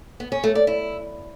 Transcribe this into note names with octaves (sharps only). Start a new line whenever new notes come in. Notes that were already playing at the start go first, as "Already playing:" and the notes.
B3
C#4
A3
D5
E4